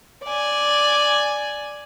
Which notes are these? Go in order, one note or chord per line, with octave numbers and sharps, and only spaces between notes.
D5 G#5